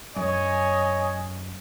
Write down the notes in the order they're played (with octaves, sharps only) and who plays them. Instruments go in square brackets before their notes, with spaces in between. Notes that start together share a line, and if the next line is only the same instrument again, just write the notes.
[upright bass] F#2 [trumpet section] C#5 D#5 G#5